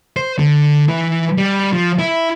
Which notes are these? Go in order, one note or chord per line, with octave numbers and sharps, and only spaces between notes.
C5
D3
E3
G3
F3
E4